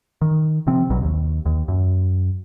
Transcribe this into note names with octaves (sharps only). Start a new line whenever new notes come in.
D#3
C3 F3 C4
A#1 B2 F#3
D#2
D#2
F#2